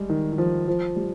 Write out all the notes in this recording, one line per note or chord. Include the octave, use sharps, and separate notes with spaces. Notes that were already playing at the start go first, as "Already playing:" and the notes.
Already playing: G3 G#3
D#3
D#3
F3
F3
G3